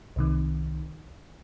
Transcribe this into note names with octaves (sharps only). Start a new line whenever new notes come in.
C2 C3 D#3